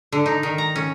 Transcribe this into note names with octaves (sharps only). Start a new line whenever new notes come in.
D3
D#4
D#3
A#5
C#4